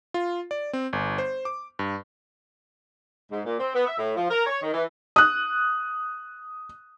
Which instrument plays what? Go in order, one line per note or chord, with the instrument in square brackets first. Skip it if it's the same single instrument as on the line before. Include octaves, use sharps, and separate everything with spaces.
[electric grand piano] F4
D5
C4
G1
C5
D6
G2
[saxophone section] G#2
A#2
C4
B3
E5
A2
F3
A#4
C#5
D#3
E3
[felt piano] D#6 F#6